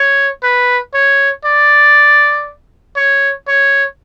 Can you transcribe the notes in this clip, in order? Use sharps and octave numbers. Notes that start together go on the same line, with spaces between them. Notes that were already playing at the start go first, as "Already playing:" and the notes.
Already playing: C#5
B4
C#5
D5
C#5
C#5